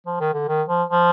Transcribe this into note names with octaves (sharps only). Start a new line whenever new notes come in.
F3
D#3
D3
D#3
F3
F3